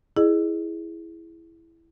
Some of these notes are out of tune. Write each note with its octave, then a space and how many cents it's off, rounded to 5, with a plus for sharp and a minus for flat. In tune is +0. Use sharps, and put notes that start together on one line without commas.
E4 +0 G#4 +0 D#5 -30